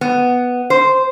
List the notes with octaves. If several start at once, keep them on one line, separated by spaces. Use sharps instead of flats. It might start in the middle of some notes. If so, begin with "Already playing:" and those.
B3
C5